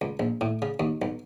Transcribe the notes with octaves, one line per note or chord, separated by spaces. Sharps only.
C#2
A#1
A2
C#3
D#2
B1